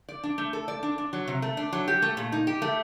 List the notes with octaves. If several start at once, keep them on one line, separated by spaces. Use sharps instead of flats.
D5
D4
A3
A4
D5
D4
D4
F#3
C3
A3
D4
F#3
G4
A3
A#2
D#4
G4
A3